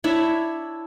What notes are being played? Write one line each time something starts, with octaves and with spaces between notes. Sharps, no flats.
D4 E4 C#5 E5